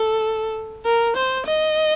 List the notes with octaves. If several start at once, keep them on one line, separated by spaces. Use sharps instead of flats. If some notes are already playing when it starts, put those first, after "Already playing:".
Already playing: A4
A#4
C5
D#5